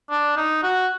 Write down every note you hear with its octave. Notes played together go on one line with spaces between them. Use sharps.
D4
D#4
F#4